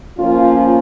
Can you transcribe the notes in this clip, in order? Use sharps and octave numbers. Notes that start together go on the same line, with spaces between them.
F3 A#3 C#4 F4